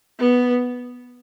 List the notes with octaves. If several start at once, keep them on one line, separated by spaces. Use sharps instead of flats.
B3